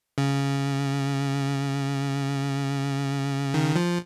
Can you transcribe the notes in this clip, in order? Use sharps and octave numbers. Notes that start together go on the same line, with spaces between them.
C#3
D#3
F3